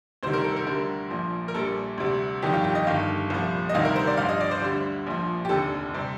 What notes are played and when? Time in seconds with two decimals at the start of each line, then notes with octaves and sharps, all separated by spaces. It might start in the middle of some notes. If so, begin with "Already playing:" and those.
0.23 D2 C3 D#3 G3 C5
0.33 A#4
0.44 A4
0.56 A#4
0.67 D2 D3 G3 A#4
1.10 A#1 A#2 F3
1.48 A#4
1.54 A#1 A#2 G3 A4
1.98 D2 C3 G3
2.42 G1 F2 D#3 G3 G4
2.54 F4
2.64 G4
2.75 D#5
2.87 G1 G2 D#3 F5
3.30 C2 A#2 F3
3.69 D#5
3.74 D2 C3 D#3 G3 F5
3.85 A#4
3.96 C5
4.07 D5
4.17 A1 G2 F3 F5
4.29 D#5
4.41 D5
4.51 C5
4.61 D2 D3 G3
5.07 A#1 A#2 F3
5.45 G4
5.49 F1 D#2 D3 A4
5.94 C3 G3